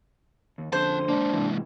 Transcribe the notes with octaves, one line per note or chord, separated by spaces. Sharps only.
D#2
F2 D3 C#4 C5 A5
G#3 A#3 D4
G#2 C3 E3